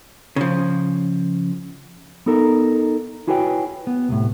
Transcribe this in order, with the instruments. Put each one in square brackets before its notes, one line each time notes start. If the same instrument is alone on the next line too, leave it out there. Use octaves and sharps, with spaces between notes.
[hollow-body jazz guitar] C#3 F3
[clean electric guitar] B3 D#4 A4 A#4
E4 F#4 G#4 B4 C#5 G5
B3
C2 A2